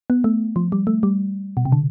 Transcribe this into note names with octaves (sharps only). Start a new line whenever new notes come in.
B3
A3
F3
G3
A3
G3
B2
C3
D3